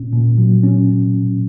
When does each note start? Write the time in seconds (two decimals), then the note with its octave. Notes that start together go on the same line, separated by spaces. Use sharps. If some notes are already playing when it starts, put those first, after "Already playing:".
Already playing: A#2 C#4
0.12 A#2
0.38 F#3
0.63 C#4